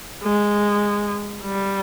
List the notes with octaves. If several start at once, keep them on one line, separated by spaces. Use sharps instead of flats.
G#3
G3